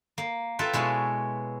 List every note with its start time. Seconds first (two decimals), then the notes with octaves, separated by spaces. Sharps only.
0.18 A#3
0.59 F4 A4 B4 E5 G5
0.73 B2 G#3 E4 C#5 A5